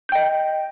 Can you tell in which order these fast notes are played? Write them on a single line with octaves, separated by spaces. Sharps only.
G6 G5 D#5